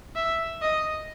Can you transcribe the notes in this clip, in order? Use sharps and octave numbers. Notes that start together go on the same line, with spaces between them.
E5
D#5